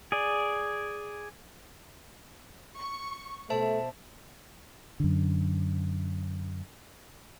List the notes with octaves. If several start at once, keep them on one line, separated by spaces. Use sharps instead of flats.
G#4 D5
C#6
B2 A3 C5 E5 A5
F#2 D3